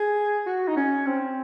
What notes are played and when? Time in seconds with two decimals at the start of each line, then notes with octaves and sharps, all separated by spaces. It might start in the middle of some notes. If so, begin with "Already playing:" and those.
Already playing: G#4
0.46 F#4
0.68 D#4
0.77 C#4
1.06 C4